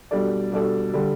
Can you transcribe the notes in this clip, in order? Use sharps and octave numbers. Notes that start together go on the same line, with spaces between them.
B2 G3 D4 A4 D5
B2 G3 D4 A4 D5
D3 G3